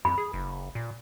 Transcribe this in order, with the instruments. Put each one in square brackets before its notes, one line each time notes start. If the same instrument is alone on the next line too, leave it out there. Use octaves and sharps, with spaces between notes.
[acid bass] F2 [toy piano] B5
[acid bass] G#4
F#1
A#2